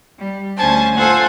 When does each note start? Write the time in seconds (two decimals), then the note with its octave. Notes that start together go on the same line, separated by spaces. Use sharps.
0.16 G3
0.57 D2 C#4 C5 G#5 A5
0.96 F4 A4 C5 F#5 G#5